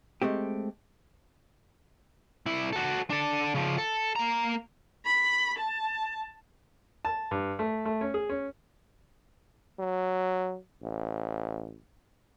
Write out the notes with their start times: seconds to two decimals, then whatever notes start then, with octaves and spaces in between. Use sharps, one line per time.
0.22 G#3 A3 C4 G4
2.46 C2 E4
2.73 F#4 A4
3.10 D4 A4
3.55 C#3 F3
3.78 A4
4.16 A#3 A#5
5.06 B5
5.58 A5
7.05 A5
7.31 G2
7.59 A3
7.85 A3
8.01 C#4
8.14 G#4
8.29 C#4
9.80 F#3
10.83 A1